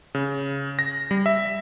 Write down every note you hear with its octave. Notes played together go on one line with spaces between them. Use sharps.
C#3
A#6
G3
E5